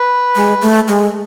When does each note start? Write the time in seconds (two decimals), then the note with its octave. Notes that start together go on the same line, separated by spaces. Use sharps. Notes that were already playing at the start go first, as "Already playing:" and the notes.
Already playing: B4
0.35 G#3
0.62 A3
0.88 G#3